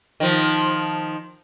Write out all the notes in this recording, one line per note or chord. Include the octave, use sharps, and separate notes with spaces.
D#3 F3